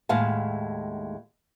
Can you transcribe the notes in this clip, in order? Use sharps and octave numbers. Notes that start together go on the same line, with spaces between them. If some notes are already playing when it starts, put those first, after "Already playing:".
D#2 A2 G#3 F5 F#5 A5